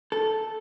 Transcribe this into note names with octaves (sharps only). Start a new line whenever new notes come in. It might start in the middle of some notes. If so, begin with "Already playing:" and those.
A4